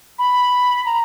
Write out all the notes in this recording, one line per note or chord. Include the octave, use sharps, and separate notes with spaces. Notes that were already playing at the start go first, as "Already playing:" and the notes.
B5
A#5